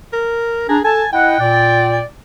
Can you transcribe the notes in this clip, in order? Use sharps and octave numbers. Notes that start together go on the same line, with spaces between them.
A#4
D4 G#4 A#5
A4 G#5 A5
E4 D#5 F#5 G5
A#2 D5